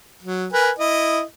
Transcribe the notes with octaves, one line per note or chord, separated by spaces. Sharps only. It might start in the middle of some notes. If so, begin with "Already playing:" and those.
F#3
A#4 B4 G#5
E4 D#5